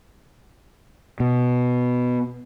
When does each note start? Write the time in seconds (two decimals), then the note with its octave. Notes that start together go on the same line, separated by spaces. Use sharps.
1.20 B2